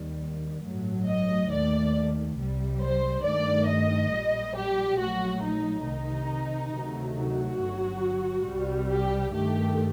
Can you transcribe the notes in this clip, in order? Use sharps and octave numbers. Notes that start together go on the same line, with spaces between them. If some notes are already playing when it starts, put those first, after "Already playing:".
Already playing: D#2 D#3 G3
A1 G2 F#3 A3
D#5
D#2 D#3 A3 D5
C2 C3 G3
C5
G2 D#3 A3 D5
D#5
A#1 A#2 G3
G4
A#1 A#2 F#3 A3 F#4
D#4
C2 C3 D#3 D#4
D2 C3 D#3 F#3 A3
F#4
G1 G2 F#3
C2 C3 G3
G4
G2 D#3 A3 G4